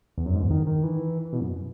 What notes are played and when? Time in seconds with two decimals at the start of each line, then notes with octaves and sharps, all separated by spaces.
0.18 E2
0.25 F#2
0.34 G#2
0.42 E2
0.50 D#3
0.67 D#3
0.84 E3
1.33 B2
1.41 F#2